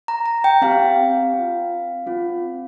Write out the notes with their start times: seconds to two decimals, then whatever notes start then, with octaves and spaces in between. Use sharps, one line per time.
0.08 A#5
0.26 A#5
0.44 G5
0.62 C4 G4 F5
1.34 C4 F4
2.07 C4 F4